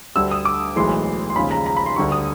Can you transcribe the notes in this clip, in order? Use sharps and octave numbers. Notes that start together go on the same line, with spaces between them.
D2 D3 G3 E6
D#6
D6
B1 A2 E3 G#3 C6
C6
D#2 C#3 F3 G#3 B5
A#5
A#5
B5
C6
D2 D3 G3 C#6
D#6